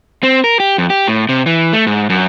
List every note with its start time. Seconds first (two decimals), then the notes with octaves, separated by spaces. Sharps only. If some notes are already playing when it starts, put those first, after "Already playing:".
0.23 C4
0.44 A#4
0.60 G4
0.78 F2
0.90 G4
1.08 A2
1.29 C3
1.46 E3
1.73 A3
1.87 G#2
2.10 F#2